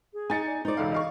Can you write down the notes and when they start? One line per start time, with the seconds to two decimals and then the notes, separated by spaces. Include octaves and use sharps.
0.14 G#4
0.30 D#4 G#5 A6 C#7
0.47 D5
0.65 D#4 C5 D5
0.77 E1 C#2 A4 F5
0.92 D#5 F5 C#6